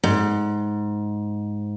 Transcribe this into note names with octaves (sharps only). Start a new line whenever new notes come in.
G#2